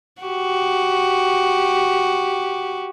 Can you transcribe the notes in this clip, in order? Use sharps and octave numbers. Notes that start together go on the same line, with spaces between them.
F#4 G4